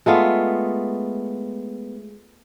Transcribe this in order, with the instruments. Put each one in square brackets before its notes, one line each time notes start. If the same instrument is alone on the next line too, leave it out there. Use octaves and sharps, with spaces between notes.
[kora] G#3 A3 B3 F4